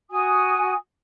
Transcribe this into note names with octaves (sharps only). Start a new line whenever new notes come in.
F#4 G#5 D#6